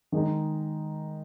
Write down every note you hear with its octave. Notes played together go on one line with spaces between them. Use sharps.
D#3 G#3 D#4